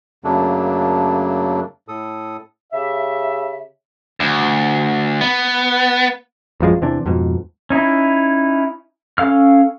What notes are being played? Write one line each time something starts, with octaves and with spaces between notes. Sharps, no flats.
F#2 C#3 F#3 A3 A#3 D4
A2 A4 D#6
C#3 G4 E5
D2
B3
A1 F#2 F3 G#3
E2 C3 E3 D4
F2 G#2 B2
C#4 D#4 E4
C#4 A4 F5 F6